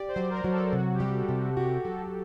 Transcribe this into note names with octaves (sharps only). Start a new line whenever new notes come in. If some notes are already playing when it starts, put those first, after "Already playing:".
Already playing: G4 D5
C5
F#3
A#4
F#3
A4
C3 F#4
G4
G3
A4
C3
F#4
F#4 G4
F#3 A4